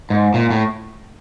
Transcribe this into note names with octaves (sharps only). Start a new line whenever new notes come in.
G#2
A#2
A2